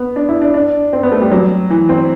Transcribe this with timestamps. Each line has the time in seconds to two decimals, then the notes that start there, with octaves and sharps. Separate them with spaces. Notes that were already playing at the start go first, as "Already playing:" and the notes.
Already playing: B3
0.16 D4
0.29 E4
0.42 D4
0.54 D4
0.93 C4
1.03 B3
1.12 A3
1.21 G3
1.32 F#3
1.70 E3
1.89 C4